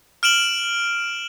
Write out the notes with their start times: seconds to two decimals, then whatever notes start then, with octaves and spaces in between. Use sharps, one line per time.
0.23 F6 D7 E7 F#7